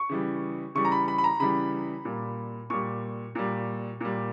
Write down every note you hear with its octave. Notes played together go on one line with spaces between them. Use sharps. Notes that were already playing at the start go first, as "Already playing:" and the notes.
Already playing: C#6
C#3 E3 G3
C#3 E3 G3 C#6
A#5
B5
B5
B5
A#5
C#3 E3 G3 B5
A#2 G3
A#2 G3 C#6
A#2 G3
A#2 G3